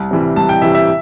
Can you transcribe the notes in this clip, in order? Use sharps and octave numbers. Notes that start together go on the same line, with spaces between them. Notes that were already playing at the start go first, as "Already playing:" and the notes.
Already playing: C2
C3 E3 G3
C2 A5
G5
C3 E3 G3 E5
E5